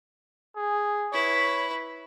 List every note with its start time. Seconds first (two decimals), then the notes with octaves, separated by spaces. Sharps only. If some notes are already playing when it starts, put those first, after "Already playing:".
0.56 G#4
1.13 E4 B4 C#5